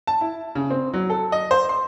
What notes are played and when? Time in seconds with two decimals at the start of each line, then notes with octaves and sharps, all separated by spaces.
0.07 A5
0.21 E4
0.55 C#3
0.70 C4
0.93 F#3
1.10 A4
1.32 D#5
1.51 C5
1.69 C6